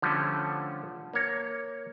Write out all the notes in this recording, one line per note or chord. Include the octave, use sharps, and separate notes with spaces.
D3 F3 G3 A3 C#4
A#3 C#5